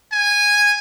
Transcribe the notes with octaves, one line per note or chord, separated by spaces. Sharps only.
G#5